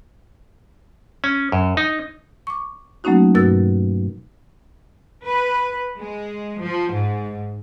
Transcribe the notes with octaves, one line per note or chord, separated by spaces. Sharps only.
C#4
F#2
D#4
C#6 D6
F#3 A3 A#3 C#4 D#4 F#4
G2 B2 F#4 A#4 E6 A6
B4
G#3
F3
G#2